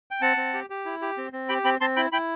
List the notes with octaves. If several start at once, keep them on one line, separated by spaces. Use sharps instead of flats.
G5
C4 F#5 A5
C4
G4
G4
E4
G4
C4
C4
G4 G5 B5
C4 G5 B5
C4 A5 C6
E4 G5 B5
E4 G5 B5